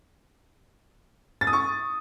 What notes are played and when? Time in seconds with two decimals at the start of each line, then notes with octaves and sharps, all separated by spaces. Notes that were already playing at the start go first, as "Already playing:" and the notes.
1.41 A6
1.47 D#6
1.53 C#6